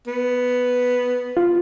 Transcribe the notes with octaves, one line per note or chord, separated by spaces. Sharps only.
B3
F4